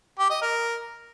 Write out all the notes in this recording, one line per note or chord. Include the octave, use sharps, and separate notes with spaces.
G4
D#5
A#4